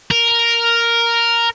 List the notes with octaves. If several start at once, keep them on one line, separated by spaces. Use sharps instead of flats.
A#4